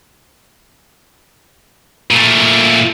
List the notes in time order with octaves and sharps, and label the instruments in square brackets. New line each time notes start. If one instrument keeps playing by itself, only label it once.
[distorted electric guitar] A#2 A3